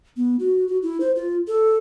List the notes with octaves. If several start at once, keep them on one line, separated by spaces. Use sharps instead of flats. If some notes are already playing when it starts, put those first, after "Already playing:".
B3
F#4
F#4
E4
C5
F4
A4